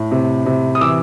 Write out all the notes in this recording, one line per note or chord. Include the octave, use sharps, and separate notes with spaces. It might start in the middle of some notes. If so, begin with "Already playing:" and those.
Already playing: A2
C3
C3
D#6
E3 D6 E6